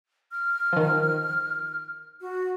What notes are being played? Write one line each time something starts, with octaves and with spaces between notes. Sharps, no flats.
F6
D#3 F3
F#4